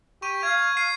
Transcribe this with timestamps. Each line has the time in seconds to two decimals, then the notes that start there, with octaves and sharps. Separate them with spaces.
0.22 G4 C#6 D#7
0.43 F5 G#6
0.77 F5 C7 D#7